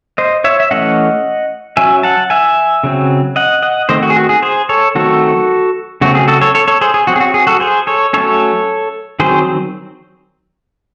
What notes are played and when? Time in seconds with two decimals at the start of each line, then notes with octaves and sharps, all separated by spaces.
0.18 C5 D#5
0.44 C#5 E5
0.60 E5
0.71 E3 A3 C#4 D#5 F#5
1.77 F#3 C#4 E5 G#5
2.03 F#5 A5
2.30 E5 G#5
2.84 C#3 F#3 C4
3.36 D#5 F#5
3.63 D#5 F#5
3.89 D#3 A3 C4 C5 D#5
4.03 F#4
4.10 G#4
4.16 F#4
4.29 G#4
4.42 G#4 C5
4.69 A4 C#5
4.95 D#3 F#3 A3 C4 F#4 A4
6.01 C#3 F#3 A3 C4 F#4
6.15 G#4
6.28 F#4 A4
6.41 A4 C#5
6.55 A4 C#5
6.68 A4 C#5
6.81 G#4 C5
6.94 G#4
7.07 F#3 C4 F#4
7.16 G#4
7.20 F#4
7.34 G#4
7.47 F#4 A4
7.60 G#4 C5
7.87 A4 C#5
8.13 F#3 A3 C#4 A4 C#5
9.20 D#3 F#3 C4 G#4 C5